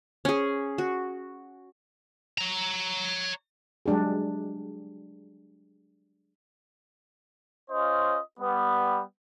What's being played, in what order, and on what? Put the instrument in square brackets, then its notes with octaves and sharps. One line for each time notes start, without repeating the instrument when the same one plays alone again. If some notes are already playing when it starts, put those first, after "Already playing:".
[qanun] C#4 G#4
F#4
[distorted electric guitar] C#5 A#5
[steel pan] F#3 G#3 D4 G4 G#4
[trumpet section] C#4 F4 C5 D#5
G3 B3